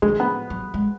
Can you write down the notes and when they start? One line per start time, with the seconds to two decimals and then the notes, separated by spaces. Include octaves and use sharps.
0.02 D#3 G#3
0.20 B3
0.50 F#3
0.74 G#3